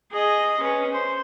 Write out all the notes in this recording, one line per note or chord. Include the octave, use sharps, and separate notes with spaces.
G#4 D#5
C#4 B4
C5